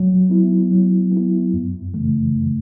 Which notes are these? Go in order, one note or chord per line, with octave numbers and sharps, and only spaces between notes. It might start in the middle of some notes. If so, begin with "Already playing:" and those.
Already playing: F#3
B3 E4
F#3
B3
E4
F#2
C#3 E3 A3
F#2